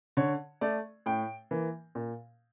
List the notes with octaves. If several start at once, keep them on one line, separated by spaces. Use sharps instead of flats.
D3 C#5
A3 D5
A2 G5
E3 A#3
A#2